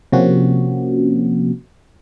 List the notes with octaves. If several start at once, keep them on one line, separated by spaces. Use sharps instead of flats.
C3 F3 A#3 C4 C#4 F#4